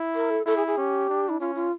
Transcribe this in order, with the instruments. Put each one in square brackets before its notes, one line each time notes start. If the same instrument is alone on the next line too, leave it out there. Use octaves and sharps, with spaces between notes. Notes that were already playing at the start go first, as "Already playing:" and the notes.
Already playing: [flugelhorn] E4
[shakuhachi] A#4
A4
[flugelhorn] E4 [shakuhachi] A4
[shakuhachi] G#4
G#4
[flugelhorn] C#4 [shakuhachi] G4
[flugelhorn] D4
[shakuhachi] E4
[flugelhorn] C#4 [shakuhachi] F4
[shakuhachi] F4